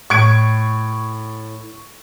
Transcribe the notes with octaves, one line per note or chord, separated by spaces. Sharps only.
A2 C#6 G#6 D7